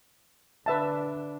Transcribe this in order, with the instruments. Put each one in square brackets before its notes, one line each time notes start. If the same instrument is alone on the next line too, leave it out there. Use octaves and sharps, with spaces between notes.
[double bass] D3 D4 [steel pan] B4 E5 A5